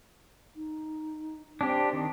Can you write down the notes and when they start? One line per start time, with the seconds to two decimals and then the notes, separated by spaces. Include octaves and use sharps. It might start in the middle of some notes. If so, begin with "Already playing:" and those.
0.56 D#4
1.61 C4 D4 G4
1.93 D#3